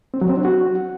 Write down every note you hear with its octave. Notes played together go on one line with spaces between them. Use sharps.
C4
F#3
C4
D4
F#4